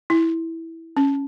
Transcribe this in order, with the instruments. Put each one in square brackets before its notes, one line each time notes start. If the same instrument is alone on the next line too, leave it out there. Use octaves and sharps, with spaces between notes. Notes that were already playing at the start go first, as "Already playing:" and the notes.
[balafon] E4
C#4